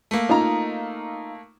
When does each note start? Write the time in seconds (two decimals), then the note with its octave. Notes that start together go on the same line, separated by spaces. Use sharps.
0.11 A3 A#3
0.29 D#4 F4 A#5